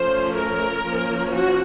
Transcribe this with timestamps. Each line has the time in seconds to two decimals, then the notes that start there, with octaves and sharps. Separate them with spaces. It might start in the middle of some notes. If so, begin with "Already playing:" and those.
Already playing: F3 A3 C#4 C5
0.37 A#4
0.84 F3 A#3 C#4
1.32 F#4